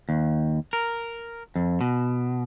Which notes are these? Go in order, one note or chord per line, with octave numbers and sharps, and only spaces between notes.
D#2
A#4
F2
B2